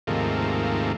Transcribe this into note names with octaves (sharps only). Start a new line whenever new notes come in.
D#2 G#2 C3 F3 A3 A#3